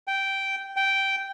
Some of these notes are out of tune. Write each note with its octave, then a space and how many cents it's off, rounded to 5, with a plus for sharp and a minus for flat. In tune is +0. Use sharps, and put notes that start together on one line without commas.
G5 -10
G5 -10